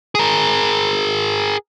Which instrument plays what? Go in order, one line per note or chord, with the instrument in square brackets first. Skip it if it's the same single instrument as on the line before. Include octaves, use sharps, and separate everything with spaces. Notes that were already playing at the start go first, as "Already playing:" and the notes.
[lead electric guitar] G#4 A#4